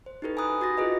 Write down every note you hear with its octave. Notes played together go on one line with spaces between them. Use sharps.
C5
D#4 E4 G4 A4 B4
G#5 A#5 B5 D#6 F#6
F#4 A6 A#6
E4 F4 G4 G#4 B4 D#5